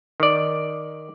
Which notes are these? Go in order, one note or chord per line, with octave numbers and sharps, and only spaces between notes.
D#3 D5